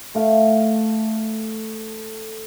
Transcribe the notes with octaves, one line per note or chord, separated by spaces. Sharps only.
A3 F5